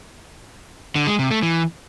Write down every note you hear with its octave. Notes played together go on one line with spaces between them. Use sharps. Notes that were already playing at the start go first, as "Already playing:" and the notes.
D3
G#3
C3
A3
E3